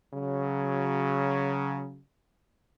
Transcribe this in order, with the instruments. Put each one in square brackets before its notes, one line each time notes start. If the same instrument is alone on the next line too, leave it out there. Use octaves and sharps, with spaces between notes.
[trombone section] C#3 F#3